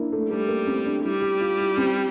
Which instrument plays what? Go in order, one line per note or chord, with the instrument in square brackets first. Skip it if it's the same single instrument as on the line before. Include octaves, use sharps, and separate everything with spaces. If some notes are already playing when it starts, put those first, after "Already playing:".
Already playing: [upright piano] A#3 D4 E4
A3
[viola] G3 [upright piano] A3
[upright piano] A#3
C4
D4
[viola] G3 [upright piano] E4
[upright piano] G4
F4
E4
C4